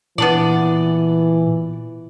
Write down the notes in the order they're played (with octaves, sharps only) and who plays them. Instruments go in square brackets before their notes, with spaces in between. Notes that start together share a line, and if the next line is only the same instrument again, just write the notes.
[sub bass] A#2 [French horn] E3 [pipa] B3 D4 D5